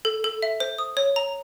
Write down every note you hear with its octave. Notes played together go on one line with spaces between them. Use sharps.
A4
A4
E5
C5
D#6
C#5
A#5